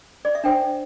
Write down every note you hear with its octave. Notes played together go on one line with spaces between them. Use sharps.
D5
E5
D4 C5 G5